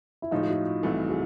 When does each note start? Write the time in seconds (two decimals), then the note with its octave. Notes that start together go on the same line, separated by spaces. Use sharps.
0.22 E4
0.31 A2 F3 G#3 D#4 F4
0.43 F4
0.48 E4 F#4
0.83 C2 C3 E3 A3
1.09 F#4 G#4